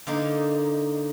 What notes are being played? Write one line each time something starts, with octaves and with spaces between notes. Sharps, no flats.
D3 A#3 D#4